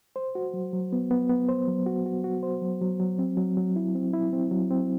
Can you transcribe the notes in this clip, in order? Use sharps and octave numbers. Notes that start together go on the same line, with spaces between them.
C5
F#4
F#3
F#3
B3
B3
B3
C5
F#3
F#4
F#4
F#4
C5
F#3
F#3
F#3
C4
F#3
F#3
E4
C4
E4
C4
F#3
C4